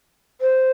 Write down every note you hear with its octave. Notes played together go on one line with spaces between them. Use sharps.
C5